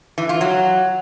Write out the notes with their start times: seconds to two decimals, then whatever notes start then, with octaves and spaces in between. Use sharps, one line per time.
0.18 E3
0.29 F4
0.41 F#3